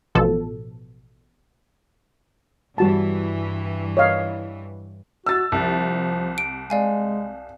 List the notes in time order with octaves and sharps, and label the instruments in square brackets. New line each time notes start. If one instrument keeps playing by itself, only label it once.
[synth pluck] A1 B2 F3 A4
[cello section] G2 E3 [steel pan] G3 F#4 A5
[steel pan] C#5 D#5 F5
[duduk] F#4 [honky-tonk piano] E6 A6
[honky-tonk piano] C2 [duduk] F3
[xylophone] D7
[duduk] G#3 [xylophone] D5 F5 G#5